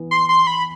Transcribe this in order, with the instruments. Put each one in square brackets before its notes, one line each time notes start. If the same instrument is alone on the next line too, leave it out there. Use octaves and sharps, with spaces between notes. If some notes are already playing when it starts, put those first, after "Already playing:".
Already playing: [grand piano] E3 B3
[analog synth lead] C6
C6
B5